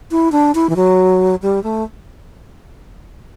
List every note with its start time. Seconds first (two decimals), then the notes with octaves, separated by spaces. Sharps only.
0.11 E4
0.32 D4
0.55 E4
0.70 E3
0.76 F#3
1.42 G3
1.64 A3